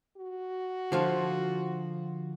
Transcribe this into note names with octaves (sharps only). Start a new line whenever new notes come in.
F#4
D3 F3 F4